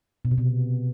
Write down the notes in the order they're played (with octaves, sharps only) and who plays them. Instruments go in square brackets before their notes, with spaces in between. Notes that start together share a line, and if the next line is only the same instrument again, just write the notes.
[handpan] B2
C3
B2